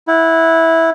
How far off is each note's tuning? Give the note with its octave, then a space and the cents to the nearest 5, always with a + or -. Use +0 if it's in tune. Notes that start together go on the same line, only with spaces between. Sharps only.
E4 -10 F#5 +0